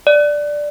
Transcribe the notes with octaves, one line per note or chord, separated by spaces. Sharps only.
D5